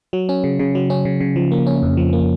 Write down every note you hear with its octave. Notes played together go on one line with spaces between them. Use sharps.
F#3
C#4
C#3
C#3
F#3
C#4
C#3
C#3
F3
A#3
C#4
F2
F3
A#3